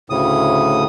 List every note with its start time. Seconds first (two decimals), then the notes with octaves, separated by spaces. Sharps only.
0.10 D2 A2 C#3 D#6